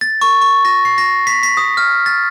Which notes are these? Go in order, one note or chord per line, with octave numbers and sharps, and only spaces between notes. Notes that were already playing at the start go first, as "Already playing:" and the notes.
A6
C#6
C#6
A#6
C7
A#6
B6
B6
D#6
F6
A6